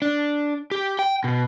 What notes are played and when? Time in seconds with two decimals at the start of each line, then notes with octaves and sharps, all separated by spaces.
0.02 D4
0.71 G4
0.99 G5
1.24 B2